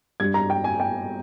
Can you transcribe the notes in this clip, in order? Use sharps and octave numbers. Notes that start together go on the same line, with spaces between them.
G2 G3 G#6
A#5
G5
G#5
G5